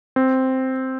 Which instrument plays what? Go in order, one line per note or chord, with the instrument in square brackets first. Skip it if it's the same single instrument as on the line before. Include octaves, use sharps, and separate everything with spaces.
[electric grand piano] C4